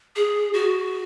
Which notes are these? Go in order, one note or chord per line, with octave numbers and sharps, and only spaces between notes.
G#4
F#4